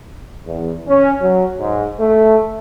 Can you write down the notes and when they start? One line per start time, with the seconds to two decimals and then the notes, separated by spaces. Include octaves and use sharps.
0.45 E2
0.87 C#4
1.20 F#3
1.58 G#2
1.99 A3